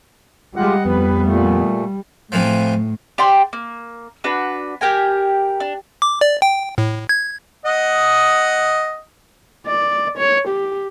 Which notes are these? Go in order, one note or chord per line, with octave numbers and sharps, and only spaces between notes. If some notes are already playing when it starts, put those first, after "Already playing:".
G3 G#3 F4 G4 D#5 F#5
F2 B3 B4
A#2 A3
A2 C3 E3 F3
G4 D5 G5 C6
A#3
D4 F#4 B4
G4 A#4 G#5
D4
D6
D5
G5
A2
G#6
D#5 F#5 D#6
D5
C#5
G4